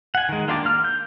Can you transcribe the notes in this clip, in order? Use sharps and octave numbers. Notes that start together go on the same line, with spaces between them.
F#5 G#5
D#3 G#3
A#3 D4 F4 G4 D5
A#3 F6
G6